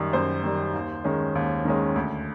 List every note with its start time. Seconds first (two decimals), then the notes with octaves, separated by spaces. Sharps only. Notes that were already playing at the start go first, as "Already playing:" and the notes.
Already playing: F#2 D#3 G3
0.13 F#2 C5
0.44 D#3 G3
0.74 D#2
1.04 D#3 G#3 C#4
1.35 D#2
1.65 D#3 G#3 C#4
1.96 D2